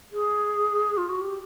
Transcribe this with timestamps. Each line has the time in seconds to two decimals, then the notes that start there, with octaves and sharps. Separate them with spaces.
0.13 G#4
0.97 F4
1.09 F#4
1.21 G4